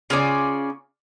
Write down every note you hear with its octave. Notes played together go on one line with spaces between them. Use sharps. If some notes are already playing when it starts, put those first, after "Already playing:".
C#3 C#4 F4 G#4 D5